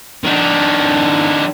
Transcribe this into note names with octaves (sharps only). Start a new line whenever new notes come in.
D#3 D4